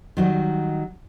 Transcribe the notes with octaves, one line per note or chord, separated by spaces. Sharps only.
D#3 F#3 G3